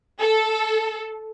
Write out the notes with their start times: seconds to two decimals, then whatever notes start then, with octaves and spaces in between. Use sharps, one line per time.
0.20 A4